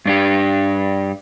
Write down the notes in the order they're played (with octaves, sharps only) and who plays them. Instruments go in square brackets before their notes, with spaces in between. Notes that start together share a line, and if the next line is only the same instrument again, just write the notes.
[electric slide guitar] G2 D4 G4